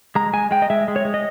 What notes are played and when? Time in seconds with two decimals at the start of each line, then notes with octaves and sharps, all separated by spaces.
0.15 G#3 A#5
0.33 G#3 G#5
0.51 G#3 G5
0.62 D#5
0.70 G#3 E5
0.88 G#3
0.96 C#5
1.05 G#3
1.14 D#5